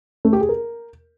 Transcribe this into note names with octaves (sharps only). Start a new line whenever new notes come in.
A3
G4
G#4
A#4